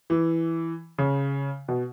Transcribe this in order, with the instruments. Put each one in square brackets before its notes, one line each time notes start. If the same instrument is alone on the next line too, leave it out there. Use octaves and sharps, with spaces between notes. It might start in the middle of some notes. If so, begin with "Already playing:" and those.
[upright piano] E3
C#3
B2